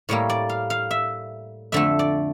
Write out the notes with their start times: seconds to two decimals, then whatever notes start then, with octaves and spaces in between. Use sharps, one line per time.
0.09 A2 G3 A#3 C#5
0.29 D5
0.49 F5
0.70 F5
0.91 E5
1.72 F2 D3 A3 E5
1.99 D5